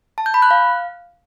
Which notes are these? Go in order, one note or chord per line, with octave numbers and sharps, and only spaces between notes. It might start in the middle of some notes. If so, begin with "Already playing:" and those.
A5
G6
B5
F#6
F5